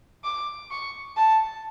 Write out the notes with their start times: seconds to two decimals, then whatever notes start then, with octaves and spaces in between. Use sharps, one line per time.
0.24 D6
0.71 C#6
1.17 A5